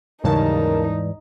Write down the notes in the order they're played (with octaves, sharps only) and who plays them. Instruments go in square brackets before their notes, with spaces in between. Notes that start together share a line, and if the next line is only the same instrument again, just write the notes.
[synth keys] D#2 C#3 A5 [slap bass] G#2 E3 G3 [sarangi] D#4 [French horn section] A#4